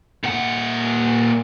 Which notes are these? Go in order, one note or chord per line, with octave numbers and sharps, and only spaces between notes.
A#2 F#5